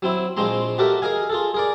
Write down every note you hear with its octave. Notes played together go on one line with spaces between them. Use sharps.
F#3 C4 E4
A#1 F3 G#3 C4 A#5 C6
F#4 G4 A4 A#4 E5
G#4 A#4 D#5 F5 G#5
F4 G#4 A4
G#4 A#4 D5